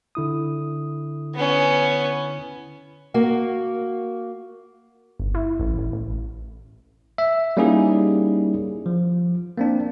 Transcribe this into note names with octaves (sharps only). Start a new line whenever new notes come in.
D3 E4 D#6
B3 C#4
A#3 F#4
G1
E4
A1
A1
A1
E5
G3 A#3 C#4 D#4 E4 G#4
F3
A#3 C4 D4